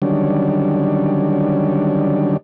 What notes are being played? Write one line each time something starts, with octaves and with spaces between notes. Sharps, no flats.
D3 D#3 F#3 G3 C#4 D4